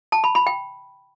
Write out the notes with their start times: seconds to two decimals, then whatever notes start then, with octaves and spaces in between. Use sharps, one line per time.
0.12 A5
0.24 B5
0.35 B5
0.47 G5